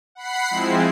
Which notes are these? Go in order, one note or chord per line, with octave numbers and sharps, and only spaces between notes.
F#5 B5 C7
F3 G#3 C4 E4